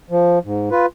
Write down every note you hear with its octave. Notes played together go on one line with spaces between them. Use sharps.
F3
G#2
F4 B4